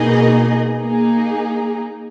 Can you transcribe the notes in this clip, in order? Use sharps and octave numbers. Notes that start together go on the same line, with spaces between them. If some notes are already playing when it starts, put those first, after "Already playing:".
Already playing: B2 A#3 D#4 G#4 D#5
A#3 D#4 G#4